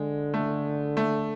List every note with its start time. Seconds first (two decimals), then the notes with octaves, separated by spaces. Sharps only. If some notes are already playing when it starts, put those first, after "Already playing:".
Already playing: D3 G#3
0.34 A3
0.97 A3